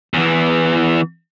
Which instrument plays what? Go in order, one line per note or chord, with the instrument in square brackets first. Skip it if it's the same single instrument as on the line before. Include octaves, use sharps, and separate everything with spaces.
[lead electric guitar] E2 E3